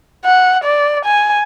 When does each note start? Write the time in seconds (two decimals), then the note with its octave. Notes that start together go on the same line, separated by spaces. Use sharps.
0.25 F#5
0.64 D5
1.05 G#5